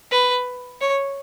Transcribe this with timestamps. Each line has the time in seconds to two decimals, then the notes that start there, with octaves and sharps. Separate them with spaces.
0.11 B4
0.81 C#5